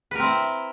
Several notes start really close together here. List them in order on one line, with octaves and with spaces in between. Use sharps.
B4 A#4 C4 E4